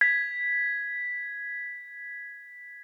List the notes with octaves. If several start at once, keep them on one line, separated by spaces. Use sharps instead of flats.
G#6 B6